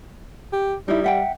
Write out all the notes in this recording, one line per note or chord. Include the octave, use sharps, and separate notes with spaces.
G4
G3 D#4 E4
E5 F#5 G5